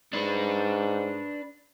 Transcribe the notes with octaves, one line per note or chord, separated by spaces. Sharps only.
G#2 D4 B4